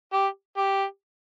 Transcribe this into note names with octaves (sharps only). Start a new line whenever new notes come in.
G4
G4